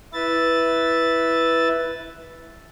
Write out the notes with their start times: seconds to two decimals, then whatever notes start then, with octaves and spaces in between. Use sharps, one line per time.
0.13 E4 B4 E5 A6